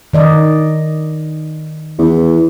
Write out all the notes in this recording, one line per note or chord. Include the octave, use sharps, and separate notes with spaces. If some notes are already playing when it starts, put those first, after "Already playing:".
D#3 D5 D#5
E2